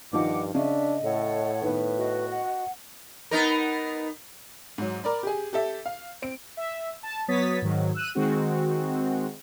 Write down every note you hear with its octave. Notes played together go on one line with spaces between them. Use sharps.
G2 D#3 F3 D#5 F#5 D6
C#3 D4 D#5 E5
A2 A4 C#5 F#5
D#3 B3 B4
F#4 D#5
F#5
B3 D#4 A#4
G#2 F#3
A#4 D5 B5
G4 G#4
G4 A4 E5
F5
C4 D7
E5
A5
F#3 B3 C#5 D#6 A6 B6
G#2 D#3 F#3
E6 F#6 D#7
D#3 G#3 C4 F#4